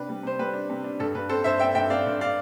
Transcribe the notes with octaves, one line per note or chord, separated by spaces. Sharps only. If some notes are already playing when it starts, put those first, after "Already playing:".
Already playing: C3 D4 B4
G3
C3 C5
G3 B4
D4
C3
D4
G2 A4
G2 B4
C4 A4 C5
G2 C5 E5
C4 E5 G5
G2 E5 G5
C4 D5 F5
G2
D5 F5